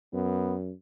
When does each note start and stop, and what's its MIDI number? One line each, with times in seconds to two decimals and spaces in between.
0.14 0.72 42
0.14 0.54 59